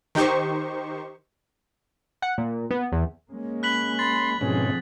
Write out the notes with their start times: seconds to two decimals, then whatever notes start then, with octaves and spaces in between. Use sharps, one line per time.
0.15 D#3 D#4 G4 C5 C#6
2.22 F#5
2.38 A#2
2.71 B3
2.92 E2
3.31 G#3 A#3 C#4
3.63 B5 F#6 B6 F#7
3.99 B5 C6 A6
4.41 G#2 B2 D3 F3 C4 C#4 G#4